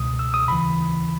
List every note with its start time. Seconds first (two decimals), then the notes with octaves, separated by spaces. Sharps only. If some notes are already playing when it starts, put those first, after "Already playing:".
Already playing: C#2 B2 D#6
0.19 E6
0.34 D#6
0.48 D#2 C#3 E3 B5